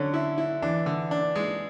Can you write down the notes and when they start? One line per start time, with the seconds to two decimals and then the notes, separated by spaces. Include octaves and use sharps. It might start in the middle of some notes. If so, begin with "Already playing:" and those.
Already playing: D3 F#3 C#4
0.14 E4
0.38 E4
0.62 E3 D4
0.86 D3
1.11 D4
1.36 G#3